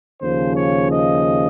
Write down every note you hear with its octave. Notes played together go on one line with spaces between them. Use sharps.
D#2 C#3 F3 C5
C#5
D#5